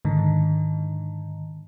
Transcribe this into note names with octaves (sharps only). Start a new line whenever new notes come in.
G#2 D3 D#3